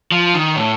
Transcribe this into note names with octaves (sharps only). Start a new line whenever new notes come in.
F3
D#3
A2